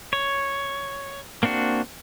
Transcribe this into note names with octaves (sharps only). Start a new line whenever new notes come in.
C#5
A#3 C4 D4 F#4